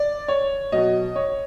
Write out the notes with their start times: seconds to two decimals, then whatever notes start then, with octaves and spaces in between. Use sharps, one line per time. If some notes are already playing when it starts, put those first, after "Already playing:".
Already playing: D5
0.28 C#5
0.72 B2 F#3 D#5
1.16 C#5